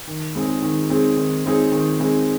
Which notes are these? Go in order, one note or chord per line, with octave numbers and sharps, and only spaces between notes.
D#3
G#3 C4 D#4 G#4
D#3
G#3 C4 D#4 G#4
D#3
G#3 C4 D#4 G#4
D#3
G#3 C4 D#4 G#4